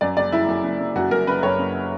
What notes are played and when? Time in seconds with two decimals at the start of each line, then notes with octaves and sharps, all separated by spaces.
0.01 F#2 D5
0.17 F#1 D5
0.32 F#1 E4
0.48 F#2
0.64 F#1
0.80 F#1
0.95 F#2 F#4
1.11 F#2 A#4
1.27 F#1 B4
1.43 F#2 C#5
1.59 F#1